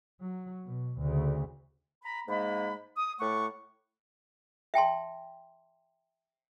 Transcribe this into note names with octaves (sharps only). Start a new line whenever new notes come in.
F#3
B2
D2 C#3
A#5 B5
G#2 G#3 A#3 B5
D#6
A2 A3 F#5 C#6 D6
E5 G5 A5 C6